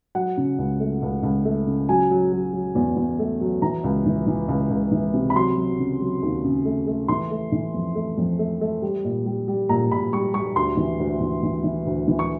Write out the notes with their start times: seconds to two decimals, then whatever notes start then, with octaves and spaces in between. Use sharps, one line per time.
0.15 F#3 F#5
0.37 C#3
0.58 C#2
0.80 A3
1.02 C#2
1.23 C#2
1.45 A3
1.67 C#3
1.89 F#3 G#5
2.11 F#3
2.32 F#3
2.53 F#3
2.75 E2
2.97 E2
3.19 A3
3.40 F#3
3.62 E3 A#5
3.84 C#2
4.06 E3
4.27 E3
4.48 C#2
4.70 C#2
4.92 E3
5.14 C3
5.30 B5
5.35 F#3 C6
5.57 F#3
5.79 C#3
6.01 F#3
6.23 D#2
6.44 C#3
6.65 A3
6.87 A3
7.08 E3 C6
7.31 A3
7.52 E3
7.74 F2
7.95 A3
8.18 F2
8.39 A3
8.61 A3
8.82 G3
9.04 A#2
9.26 G3
9.48 G3
9.69 A#2 A#5
9.91 A#2 B5
10.13 G3 C#6
10.34 G3 C#6
10.56 D2 C6
10.77 E3
10.99 D2
11.20 E3
11.43 E3
11.64 E3
11.86 D2
12.08 E3
12.19 C#6